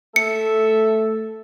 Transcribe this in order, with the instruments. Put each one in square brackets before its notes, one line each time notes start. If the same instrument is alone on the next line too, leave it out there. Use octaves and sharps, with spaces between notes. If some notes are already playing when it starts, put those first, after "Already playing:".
[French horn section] A3 [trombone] A4 [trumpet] E5 [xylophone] C#7